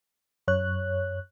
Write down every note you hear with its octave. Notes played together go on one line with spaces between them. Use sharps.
F#2 C#5 F#6